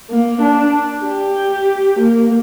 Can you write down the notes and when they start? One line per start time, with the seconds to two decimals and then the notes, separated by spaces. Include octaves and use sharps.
0.10 A#3
0.42 D4
1.04 G4
1.99 A#3